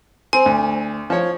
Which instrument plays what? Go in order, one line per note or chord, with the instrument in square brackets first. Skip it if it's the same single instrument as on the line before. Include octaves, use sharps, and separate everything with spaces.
[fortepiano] C4 [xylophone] G#5
[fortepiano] D2
F3 C#5